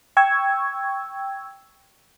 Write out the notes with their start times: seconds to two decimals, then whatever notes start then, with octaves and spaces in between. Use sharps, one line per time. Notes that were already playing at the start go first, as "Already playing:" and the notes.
0.17 G5 C#6 E6 G#6